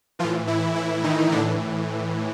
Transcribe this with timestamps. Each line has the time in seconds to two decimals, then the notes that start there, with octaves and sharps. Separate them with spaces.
0.19 E3 F3 F4
0.24 A2
0.47 E3 E4
0.76 E3 E4
1.04 D#3 D#4
1.32 A2 D3 E3 D4